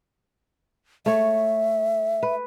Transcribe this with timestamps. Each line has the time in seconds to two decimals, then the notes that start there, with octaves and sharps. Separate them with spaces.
1.06 A3 C#5 E5
2.23 B4